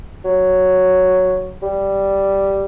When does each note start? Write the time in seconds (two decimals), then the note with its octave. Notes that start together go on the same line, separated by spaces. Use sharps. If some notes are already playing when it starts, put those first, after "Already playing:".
0.25 F#3
1.62 G3